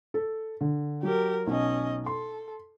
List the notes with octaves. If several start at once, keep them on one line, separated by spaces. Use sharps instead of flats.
A4
D3
F#3 G4 A#4
B1 C#4 D#5
A4 C6